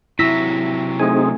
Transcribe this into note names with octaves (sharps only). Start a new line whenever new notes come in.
C3 F#3 E4 E6 A#6 B6
A3 C4 D#4 G#4 G#5